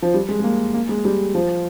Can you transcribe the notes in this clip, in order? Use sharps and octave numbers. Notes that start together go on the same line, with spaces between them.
F3
G3
G#3
G#3
A#3
A#3
G#3
G3
F3